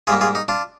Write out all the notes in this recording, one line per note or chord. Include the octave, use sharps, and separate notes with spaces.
G#2 G3 A#3 F4 G#4
F4 G#4
D#4
D4 F4